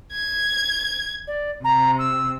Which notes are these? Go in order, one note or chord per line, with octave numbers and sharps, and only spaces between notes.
G#6
D5
C3 A#5
E6